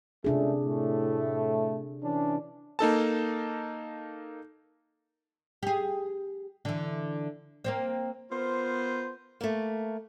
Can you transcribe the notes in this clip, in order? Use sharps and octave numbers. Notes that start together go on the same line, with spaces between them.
C#2 C3 A3 D4 G#4
A2 A3
E3 C#4 D4
A#3 D#4 A4 A5
G4 G#4
D3 E3
A#3 C4 C5
B3 F4 A#4 C5
A3 A#3